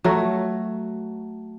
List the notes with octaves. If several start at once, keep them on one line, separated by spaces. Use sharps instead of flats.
F#3 A3